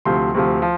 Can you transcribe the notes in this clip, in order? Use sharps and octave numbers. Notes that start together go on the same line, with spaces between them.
D2 C3 F3 C6
D2 C3 F3
F3